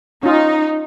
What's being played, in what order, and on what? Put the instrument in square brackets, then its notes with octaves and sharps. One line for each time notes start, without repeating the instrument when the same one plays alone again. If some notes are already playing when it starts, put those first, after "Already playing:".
[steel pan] C#4 F4 [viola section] D#4